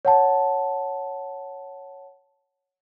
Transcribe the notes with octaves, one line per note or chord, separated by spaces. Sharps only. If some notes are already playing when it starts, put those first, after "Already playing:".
C#5 F#5 A5